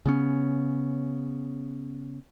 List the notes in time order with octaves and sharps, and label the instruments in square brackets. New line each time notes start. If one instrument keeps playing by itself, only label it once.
[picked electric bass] C#3 B3 C#4